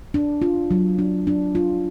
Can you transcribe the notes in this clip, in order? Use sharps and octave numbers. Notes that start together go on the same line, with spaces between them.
D4
F4
F#3
D4
D4
F4